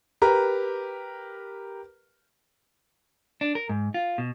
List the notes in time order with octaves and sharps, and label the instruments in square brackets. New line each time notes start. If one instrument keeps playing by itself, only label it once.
[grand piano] G4 A#4 B4 A#5
[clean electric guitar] D4
A#4
G#2
F4
B2